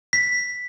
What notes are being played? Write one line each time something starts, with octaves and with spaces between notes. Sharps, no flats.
B6